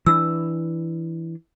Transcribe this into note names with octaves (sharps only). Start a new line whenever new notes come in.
E3 D4 E6